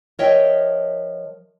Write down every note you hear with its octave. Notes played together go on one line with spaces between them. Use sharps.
F3 A#4 C#5 D#5 E5 G5